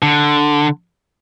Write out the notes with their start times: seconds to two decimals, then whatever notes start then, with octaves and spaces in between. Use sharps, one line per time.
0.02 D3